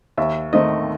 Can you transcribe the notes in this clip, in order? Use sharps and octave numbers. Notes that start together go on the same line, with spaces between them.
D#2 E5
D#3 A3 C4 D#5